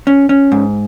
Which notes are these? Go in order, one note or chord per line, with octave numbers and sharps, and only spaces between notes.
C#4
C#4
G#2